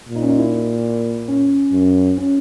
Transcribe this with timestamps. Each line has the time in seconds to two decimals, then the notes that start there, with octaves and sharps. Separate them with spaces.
0.09 A#2
0.15 D#4
0.23 C#4
0.29 D#4
0.39 E4
1.28 C#4
1.72 F#2
2.18 C#4